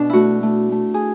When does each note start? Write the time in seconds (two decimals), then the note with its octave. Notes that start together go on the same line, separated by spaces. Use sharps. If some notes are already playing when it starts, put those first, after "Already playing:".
Already playing: B2 D4
0.10 A3 E4 F#4
0.43 A3
0.72 A3
0.94 G#4